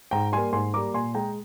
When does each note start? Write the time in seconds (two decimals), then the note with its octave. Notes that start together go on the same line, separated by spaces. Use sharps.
0.11 G#2 G5 A#5
0.32 G3 A#3 G#5 C6
0.53 G#2 G#5 C6
0.74 G3 A#3 A#5 D6
0.94 A#2 G#5 C6
1.15 G#3 G5 A#5